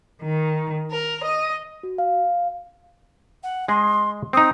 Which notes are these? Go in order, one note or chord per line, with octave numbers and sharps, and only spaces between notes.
D#3
A#4
D#5
F#4
F5
F#5
G#3 G#4 D#5 C6
C4 D#4 D#6